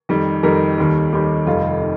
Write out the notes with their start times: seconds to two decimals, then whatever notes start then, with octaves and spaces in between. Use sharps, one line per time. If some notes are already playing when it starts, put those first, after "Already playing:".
0.09 F2 D#3 G3
0.43 F2 D#3 G3 A#4
0.78 D#2 D#3 G3
1.13 D#2 D#3 G3 G4
1.47 F1 F2 D#3 G3 F4
1.82 D#3